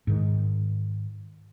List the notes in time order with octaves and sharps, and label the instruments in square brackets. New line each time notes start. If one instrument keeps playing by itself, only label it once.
[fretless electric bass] G#2 D#3